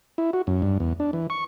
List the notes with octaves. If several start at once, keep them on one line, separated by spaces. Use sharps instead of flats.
E4
F#4
F#2
G2
E2
D4
E3
C#6